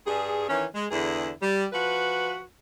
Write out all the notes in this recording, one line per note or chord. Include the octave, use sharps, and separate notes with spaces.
G2 G#4
D#3 E3 C#4
G#3
E2 D3 E4 G#4
G3
F3 F#4 B4